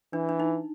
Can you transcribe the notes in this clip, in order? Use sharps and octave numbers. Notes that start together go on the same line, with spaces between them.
E3 D4
D4
D#4